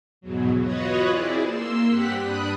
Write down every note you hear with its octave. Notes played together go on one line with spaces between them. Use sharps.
E2 G#2 B2 F#3
F4 F#4 B4 C#5 D#5 F#5
C4 E4 G#4 D5
A#3 C6 E6
G2 C4 G4 F#5 F#6 B6
G2 D4 B5 D#6 F#6